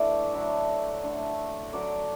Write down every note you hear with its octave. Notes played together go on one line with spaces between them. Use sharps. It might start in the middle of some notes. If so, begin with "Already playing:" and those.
Already playing: E3 A3 D4 D5
A2 F#3 D4 E5
D3 A3 D4
D3 F#3 D4 D5